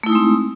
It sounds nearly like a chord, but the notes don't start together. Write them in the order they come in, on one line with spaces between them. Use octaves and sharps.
A3 E4 D#4 G#3 C4